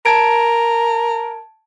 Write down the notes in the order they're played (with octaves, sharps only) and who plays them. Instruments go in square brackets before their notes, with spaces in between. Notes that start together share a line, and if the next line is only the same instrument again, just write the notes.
[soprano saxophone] A#4 [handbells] A5 G#6 D7